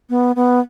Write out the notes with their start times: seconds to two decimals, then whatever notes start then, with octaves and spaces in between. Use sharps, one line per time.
0.10 B3
0.36 B3